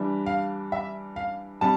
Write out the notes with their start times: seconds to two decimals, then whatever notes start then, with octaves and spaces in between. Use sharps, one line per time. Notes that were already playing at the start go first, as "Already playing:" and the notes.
Already playing: E3 G3 D4
0.26 F5
0.72 E5
1.16 F5
1.61 C3 G3 A5